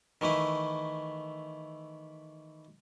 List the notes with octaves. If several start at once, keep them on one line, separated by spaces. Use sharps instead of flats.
D#3 E3 A3 E4